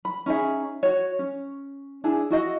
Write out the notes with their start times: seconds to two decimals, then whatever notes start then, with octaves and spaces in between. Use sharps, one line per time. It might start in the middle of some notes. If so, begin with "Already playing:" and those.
0.05 B5
0.26 C#4 D#4 G#4 E5
0.83 F#4 C#5
1.19 C#4
2.04 D4 E4 G#4
2.30 E4 F#4 D#5 F5